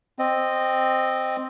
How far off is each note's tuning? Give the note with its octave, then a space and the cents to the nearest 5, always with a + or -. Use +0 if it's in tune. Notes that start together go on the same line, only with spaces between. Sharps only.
C4 +0 D#5 -10